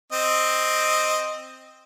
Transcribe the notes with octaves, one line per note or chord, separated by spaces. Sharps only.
C4 D#5